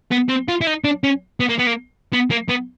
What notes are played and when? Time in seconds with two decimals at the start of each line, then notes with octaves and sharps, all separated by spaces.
0.12 B3
0.29 C4
0.49 F4
0.61 E4
0.67 D#4
0.84 D4
1.04 C#4
1.40 B3
1.49 A#3
1.59 B3
1.67 A#3
2.13 B3
2.31 A#3
2.49 B3